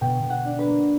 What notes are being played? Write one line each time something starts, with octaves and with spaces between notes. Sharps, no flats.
B2 G5
B2
F#5
D4
B4
A#3